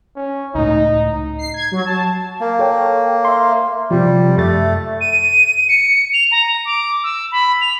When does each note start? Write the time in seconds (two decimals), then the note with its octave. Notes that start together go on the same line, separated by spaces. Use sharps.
0.16 C#4
0.55 C#2 A2 D#4
1.39 C7
1.54 G#6
1.71 F#3
1.85 A5
2.41 A#3
2.59 A4 C#5 G5
3.25 E5 C6
3.91 C3 F3 G3
4.37 F#2 A3 E5 A6
5.01 D#7
5.69 C#7
6.14 F7
6.32 A#5
6.65 D6
7.04 E6
7.32 B5
7.61 F7